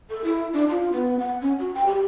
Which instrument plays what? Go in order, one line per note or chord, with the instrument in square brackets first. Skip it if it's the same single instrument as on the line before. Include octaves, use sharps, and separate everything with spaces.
[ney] A4
E4
D4
F4
B3
F#5
C#4
F#4
G5
G4